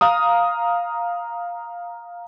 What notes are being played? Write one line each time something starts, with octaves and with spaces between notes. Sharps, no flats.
F5 A#5 D#6